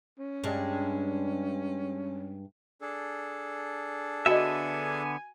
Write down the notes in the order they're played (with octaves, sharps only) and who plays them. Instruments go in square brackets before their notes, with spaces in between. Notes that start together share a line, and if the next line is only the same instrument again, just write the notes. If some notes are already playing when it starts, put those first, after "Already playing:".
[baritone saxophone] C#4
[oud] G2 G#3
[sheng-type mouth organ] D4 G#4 A4
[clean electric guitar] D3 B3 E5 [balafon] F#4 D#5 [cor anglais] G#5